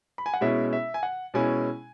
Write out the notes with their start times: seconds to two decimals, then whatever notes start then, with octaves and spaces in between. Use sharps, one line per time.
0.18 B5
0.26 G#5
0.34 F#5
0.41 B2 G#3 C#4 E4 E5
0.73 E5
0.94 G#5
1.03 F#5
1.34 B2 G#3 C#4 E4 G#5